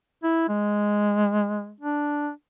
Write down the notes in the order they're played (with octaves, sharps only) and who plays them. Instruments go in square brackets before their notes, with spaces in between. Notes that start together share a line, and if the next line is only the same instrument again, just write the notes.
[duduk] E4
G#3
D4